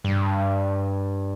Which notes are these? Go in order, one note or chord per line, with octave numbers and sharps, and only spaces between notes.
G2